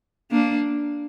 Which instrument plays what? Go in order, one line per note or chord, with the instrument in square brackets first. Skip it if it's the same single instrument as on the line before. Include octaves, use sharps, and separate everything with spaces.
[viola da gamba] A#3 D4